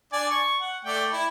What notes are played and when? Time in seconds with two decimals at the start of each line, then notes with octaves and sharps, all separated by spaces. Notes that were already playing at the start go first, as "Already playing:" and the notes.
0.13 D4 D5 G#5
0.31 C#6
0.60 F#5
0.85 A3 D5 G5
1.12 E4